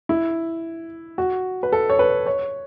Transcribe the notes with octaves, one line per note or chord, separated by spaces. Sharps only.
E4
F#4
B4
A4
C#5
B4
C#5